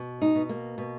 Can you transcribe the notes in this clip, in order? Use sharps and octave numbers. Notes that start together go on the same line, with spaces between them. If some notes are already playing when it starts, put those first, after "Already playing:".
Already playing: B2
D#4
B2
A#3
B2